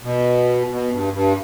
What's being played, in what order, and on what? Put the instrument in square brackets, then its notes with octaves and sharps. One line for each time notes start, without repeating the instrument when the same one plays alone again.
[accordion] B2
B2
G2
G2